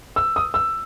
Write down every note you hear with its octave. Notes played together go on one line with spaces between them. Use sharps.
E6
D#6
E6